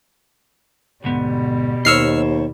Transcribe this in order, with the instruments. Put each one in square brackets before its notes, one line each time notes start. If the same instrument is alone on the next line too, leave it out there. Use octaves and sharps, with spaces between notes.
[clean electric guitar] D2 G#2 B3 [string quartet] B2 G3
[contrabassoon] D#2 [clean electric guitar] C5 C#5 D#5 [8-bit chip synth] E6 F6 C7